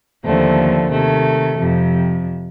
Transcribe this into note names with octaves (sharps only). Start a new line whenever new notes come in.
D#2 D3 F3 A3 C4
C3 D#3 A3
F2 C3 F3